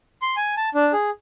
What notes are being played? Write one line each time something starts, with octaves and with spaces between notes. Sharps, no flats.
C6
G#5
A5
D4
G#4